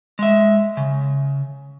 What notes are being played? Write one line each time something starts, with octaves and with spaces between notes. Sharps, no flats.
G#3 E5
C#3